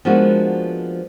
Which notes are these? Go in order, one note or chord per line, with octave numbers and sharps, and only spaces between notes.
F3 G#3 A#3 B3 D4 F#4